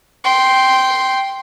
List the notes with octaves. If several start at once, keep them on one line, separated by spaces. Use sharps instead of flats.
G5 C6